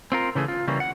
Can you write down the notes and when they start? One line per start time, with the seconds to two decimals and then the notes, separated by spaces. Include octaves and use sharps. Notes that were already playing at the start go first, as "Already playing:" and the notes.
0.12 C4 F4 A#4
0.35 C#3 E3 A3 G#4
0.48 F4
0.67 C#3 E3 G3 A#3 C#4
0.80 F#5